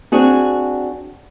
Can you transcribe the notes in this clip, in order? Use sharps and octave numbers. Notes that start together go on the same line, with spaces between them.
C4 D4 F#4 G#4